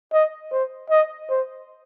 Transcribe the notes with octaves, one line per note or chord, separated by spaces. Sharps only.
D#5
C5
D#5
C5